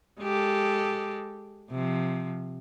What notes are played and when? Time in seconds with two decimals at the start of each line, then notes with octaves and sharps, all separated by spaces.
0.20 G#3 G4 A4
1.70 C3 F3